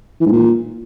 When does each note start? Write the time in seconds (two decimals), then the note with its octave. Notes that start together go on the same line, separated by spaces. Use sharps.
0.20 E3
0.26 G#2
0.32 A#2